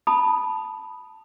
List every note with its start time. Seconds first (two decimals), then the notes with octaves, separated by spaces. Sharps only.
0.07 A5 B5 D#6